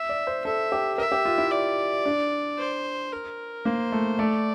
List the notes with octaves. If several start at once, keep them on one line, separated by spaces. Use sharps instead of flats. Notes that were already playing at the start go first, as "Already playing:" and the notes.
Already playing: E5
D5
C5
A4 E5
G4
A#4 E5
G4
F4
E4
D5
D4
C5
A#4
A#3 C5
A3
A3 D5